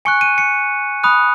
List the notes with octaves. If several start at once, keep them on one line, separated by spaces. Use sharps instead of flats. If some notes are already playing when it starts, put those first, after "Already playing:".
G#5 C#6 F#6 C#7
D#7
C#7
B5 D#6 F#6